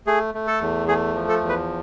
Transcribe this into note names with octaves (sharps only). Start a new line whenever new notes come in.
A3 G#4
A3
A4
E2
A3 G#4
F3
A4
E2
B4